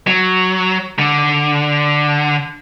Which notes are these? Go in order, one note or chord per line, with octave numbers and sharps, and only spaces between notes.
F#3
D3